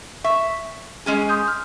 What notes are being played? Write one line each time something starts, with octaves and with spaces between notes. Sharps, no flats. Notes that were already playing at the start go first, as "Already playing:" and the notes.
E5 C#6
G#3 C#4 G#4
C6 D#6 G6
F6